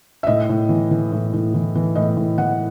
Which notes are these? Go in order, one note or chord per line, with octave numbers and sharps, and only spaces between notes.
E5
A2 D#5
A2
E3
E3
A2
A2
E3
E3
A2 D#5
A2
E3 F#5